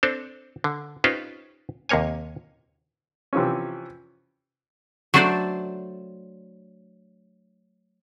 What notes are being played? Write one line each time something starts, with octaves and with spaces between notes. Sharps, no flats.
C4 D4 A4 C5
D3
C#4 D#4 F4 G4 B4 C5
D#2 C3 A#3 C#5 G#5
C3 E3 F3 C#4
F#3 A3 D4 A4 C5 D5